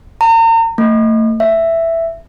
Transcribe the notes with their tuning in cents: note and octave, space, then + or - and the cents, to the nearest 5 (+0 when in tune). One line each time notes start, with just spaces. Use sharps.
A#5 -40
A3 +35
E5 +5